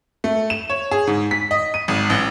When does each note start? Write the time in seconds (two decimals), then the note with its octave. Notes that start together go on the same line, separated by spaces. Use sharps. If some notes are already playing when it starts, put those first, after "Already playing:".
0.24 A3
0.50 E7
0.70 C#5
0.91 G#4
1.07 G#2
1.31 B6
1.51 D#5
1.74 D#7
1.88 G#1
2.10 A1